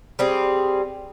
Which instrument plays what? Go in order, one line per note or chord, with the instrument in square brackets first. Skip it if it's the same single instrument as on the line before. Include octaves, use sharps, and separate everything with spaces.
[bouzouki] G3 C4 G#4